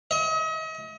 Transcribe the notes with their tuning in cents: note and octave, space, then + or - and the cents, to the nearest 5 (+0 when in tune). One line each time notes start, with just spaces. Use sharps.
D#5 +40